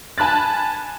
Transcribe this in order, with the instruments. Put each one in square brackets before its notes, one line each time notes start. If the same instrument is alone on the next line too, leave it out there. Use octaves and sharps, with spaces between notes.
[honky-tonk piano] G#5 A5 B5 F#6 A6